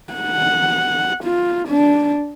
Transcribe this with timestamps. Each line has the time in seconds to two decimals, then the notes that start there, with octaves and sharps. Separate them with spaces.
0.13 F#5
1.24 F4
1.69 D4